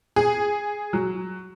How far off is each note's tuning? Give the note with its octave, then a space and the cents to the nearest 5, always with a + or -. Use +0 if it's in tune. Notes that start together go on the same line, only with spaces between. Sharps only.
G#4 +0
F#3 +0